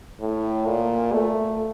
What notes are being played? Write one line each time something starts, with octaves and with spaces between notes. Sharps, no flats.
A2
A#2
A3